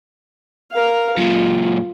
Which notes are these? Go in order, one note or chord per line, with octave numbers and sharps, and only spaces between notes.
A#4 F5
F#2 A#2 F4